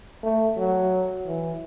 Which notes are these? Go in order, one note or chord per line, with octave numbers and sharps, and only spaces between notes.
A3
F#3
E3